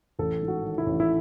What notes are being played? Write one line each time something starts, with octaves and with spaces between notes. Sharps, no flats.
A1 A4
G#2
F#4
D#3
E4
A1
E4